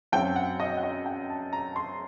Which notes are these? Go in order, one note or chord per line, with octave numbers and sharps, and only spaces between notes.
F#2 F#3 C4 G5
F#5
D#5
F#5
D#5
G5
A5
A#5
C6